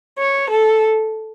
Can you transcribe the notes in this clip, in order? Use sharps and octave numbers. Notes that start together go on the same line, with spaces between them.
C#5
A4